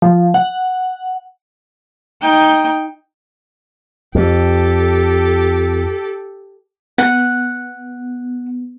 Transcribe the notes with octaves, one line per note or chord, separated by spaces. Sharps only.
F3
F#5
D#4 G5
F2 G4 A4
B3 F#5